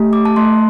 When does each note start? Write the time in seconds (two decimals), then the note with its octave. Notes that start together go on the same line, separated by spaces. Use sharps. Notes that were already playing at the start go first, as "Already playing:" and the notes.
Already playing: A3 G4
0.13 D6
0.25 A5
0.36 A3 C6